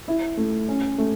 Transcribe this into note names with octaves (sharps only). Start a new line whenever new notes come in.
E4
A3
C#4
A3